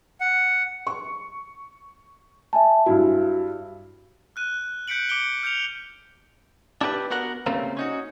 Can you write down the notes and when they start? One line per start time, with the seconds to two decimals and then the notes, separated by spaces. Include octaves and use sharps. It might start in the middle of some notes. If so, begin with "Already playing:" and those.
0.20 F#5
0.87 C#6
2.53 E5 G#5 A5
2.86 G2 E4 F#4
4.36 F6 F#6 D#7
4.88 F#6 G6 B6 C#7 D7 F#7
5.09 D6 C#7 D7 G7
5.43 F6 G6 C#7 F7
6.81 D4 E4 G4 A#4 B4
7.11 B3 F#4 A#4 F#5
7.46 C#3 G3 A3 A#3 C4
7.77 C#4 D#4 F#4